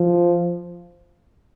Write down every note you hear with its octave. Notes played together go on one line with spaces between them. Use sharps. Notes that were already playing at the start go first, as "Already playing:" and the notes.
Already playing: F3